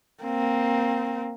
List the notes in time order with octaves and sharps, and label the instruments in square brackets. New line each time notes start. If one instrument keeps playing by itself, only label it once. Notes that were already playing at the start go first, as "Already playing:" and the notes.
[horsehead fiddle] A#3 C4